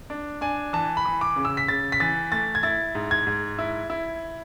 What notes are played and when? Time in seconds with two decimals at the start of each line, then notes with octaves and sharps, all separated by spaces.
0.10 D4
0.41 D4 G#5
0.73 E3 A5
0.97 B5
1.05 E3
1.21 D6
1.36 C#3
1.45 E6
1.57 B6
1.68 C#3 A6
1.92 B6
2.00 E3 A6
2.32 A3 A6
2.55 G#6
2.63 E4 A6
2.95 G#2
3.11 G#6
3.27 G#2
3.59 E4
3.90 E4